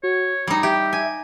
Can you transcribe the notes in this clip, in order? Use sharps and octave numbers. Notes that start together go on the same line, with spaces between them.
F#4 C#5
G3 D#4 A#6
G4 E5 G5
G#5